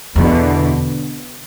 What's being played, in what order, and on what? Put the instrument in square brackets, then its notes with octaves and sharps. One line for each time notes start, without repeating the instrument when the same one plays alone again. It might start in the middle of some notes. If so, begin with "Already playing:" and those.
[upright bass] E2 [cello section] B2 D3